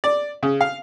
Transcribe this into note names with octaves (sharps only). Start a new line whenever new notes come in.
D5
C#3
F5